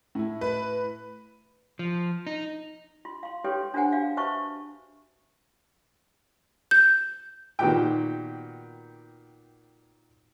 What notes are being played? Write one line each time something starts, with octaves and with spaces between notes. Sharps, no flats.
A2 E4
B4
F3
D#4
F4 C6
F5 C6
G4 A4 B4 C#5 G5 C6
D4 F4 A#4 C5 F#5 G#5
F#4 F5
F#4 B4 C5 E5 A5 C#6
G6
A#2 D#3 B3 F#4 G4 G5